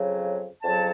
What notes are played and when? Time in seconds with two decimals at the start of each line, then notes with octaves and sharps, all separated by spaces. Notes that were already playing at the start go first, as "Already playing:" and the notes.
Already playing: F2 C#3 F#3
0.63 F2 C#3 F#3 A5